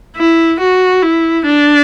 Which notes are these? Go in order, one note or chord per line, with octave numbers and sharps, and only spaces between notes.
E4
F#4
E4
D4